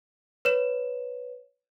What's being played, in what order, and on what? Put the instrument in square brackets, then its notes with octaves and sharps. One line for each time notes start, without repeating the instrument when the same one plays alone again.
[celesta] B4 C#5 E7